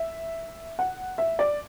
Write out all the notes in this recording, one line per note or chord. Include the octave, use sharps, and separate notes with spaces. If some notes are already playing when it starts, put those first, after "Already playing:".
Already playing: E5
F#5
E5
D5